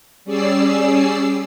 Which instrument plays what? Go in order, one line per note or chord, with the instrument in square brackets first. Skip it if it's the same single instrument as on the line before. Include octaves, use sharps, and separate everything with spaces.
[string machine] G3 C#4 G#4 D5 E6 C7